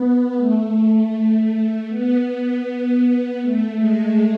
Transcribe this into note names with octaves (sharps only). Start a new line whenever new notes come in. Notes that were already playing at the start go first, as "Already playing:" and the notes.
Already playing: B3
A3
B3
A3
G#3